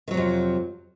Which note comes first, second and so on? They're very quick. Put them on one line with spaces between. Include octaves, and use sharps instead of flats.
D#3 F#3 C3 F2